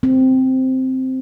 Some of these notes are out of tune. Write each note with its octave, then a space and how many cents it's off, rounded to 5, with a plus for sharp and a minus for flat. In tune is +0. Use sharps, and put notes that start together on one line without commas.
C4 -5